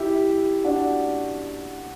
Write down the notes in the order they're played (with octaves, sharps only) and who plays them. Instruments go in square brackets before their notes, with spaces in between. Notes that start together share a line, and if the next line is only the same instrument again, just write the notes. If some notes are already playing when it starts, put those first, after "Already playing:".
Already playing: [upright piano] E4 G4
D4 F#4